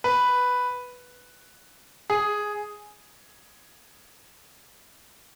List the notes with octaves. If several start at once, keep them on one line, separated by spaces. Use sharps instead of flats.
B4
G#4